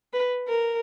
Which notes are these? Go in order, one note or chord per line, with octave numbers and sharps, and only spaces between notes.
B4
A#4